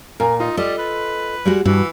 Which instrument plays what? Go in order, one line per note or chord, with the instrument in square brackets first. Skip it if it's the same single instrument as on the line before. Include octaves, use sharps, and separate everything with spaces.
[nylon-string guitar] A#2 [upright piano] A#4 G#5 A#5
[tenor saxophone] D#4 [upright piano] F4
[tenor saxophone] G3 [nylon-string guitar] A4 D#5
[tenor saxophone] B4
[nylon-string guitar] G3 G#3 F#4
[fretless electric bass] G2 [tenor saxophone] E3 [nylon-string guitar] F#4